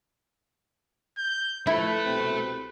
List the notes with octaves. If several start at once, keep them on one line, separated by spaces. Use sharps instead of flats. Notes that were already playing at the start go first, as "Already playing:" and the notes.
G6
F3 A3 E4 A4 B4 E5
C2 B2 C4